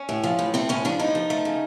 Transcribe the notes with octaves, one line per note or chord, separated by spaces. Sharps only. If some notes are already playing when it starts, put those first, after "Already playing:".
Already playing: C#4
A2
F3
A2
A3 C4
A2 C#4
F3 D4
A2 D#4
F3
A3
C#3